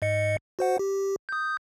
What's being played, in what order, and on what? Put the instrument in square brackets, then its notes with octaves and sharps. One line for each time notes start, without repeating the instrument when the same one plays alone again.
[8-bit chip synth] G#2 D#5 C#7
F#4 C5 F#5
G4
D#6 G6